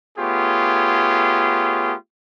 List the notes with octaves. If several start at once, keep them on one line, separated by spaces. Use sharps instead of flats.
A3 B3 F4 G4 G#4 C#5